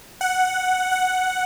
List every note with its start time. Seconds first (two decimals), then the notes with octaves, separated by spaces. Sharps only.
0.21 F#5
0.92 F#5